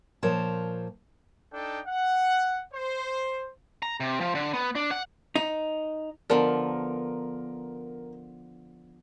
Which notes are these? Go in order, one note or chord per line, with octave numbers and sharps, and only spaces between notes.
A#2 F3 A#4 C5 C#5 A5
D4 D#4 A4 G5
F#5
C5
A#5
C3
F3
D3
B3
D4
F#5
D#4
D3 F3 B3 D4 A#4